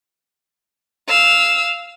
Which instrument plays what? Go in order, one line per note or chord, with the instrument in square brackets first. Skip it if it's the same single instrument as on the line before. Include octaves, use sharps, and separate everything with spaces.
[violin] F5 E6